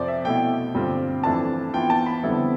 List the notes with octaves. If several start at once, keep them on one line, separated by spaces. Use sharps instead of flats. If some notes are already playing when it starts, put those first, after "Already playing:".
Already playing: F2 C3 F3 C5 D5
E5
B2 A3 E4 G5
G2 D3 G3 C4 F4
F2 E3 A3 D4 F4 A5
E3 B3 F4 G5
A5
B5
F2 D3 G3 B3 E4